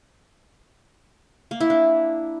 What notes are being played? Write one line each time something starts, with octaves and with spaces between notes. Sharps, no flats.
A#3
E4
D4